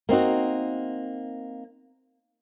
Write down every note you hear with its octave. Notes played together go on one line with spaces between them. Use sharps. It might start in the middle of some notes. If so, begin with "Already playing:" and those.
A#3 C4 D#4 F#4